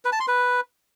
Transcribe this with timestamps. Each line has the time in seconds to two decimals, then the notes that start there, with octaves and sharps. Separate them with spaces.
0.05 B4
0.12 A5
0.20 C6
0.28 B4